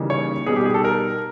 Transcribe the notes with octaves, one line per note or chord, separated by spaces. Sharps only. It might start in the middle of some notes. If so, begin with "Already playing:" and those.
Already playing: C#3 E3 G3 A#3 D#4
C#5
B2 G3 B3 D#4 G#4
G4
G#4
A4
A#4